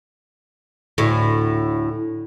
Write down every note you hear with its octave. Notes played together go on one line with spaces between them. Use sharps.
D2 A2